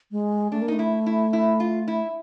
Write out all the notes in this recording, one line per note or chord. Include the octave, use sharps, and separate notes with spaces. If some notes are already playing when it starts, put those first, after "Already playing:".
G#3
A3 D4
A#3
A3 D#4
E4
E4
E4
F4
E4